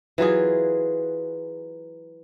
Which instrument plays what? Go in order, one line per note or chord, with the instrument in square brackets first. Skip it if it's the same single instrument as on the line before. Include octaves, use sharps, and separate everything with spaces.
[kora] E3 F#3 F4 G#4